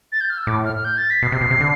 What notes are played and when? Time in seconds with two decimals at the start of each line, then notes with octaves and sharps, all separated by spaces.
0.12 A6
0.21 G6
0.30 F6
0.38 E6
0.47 A2 D6
0.65 F6
0.76 F6
0.85 G6
0.98 A6
1.10 B6
1.22 B2 C7
1.32 C3
1.41 B2
1.51 C3
1.60 D3